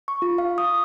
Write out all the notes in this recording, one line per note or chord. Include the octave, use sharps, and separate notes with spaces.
C#6
F4
F5
D#6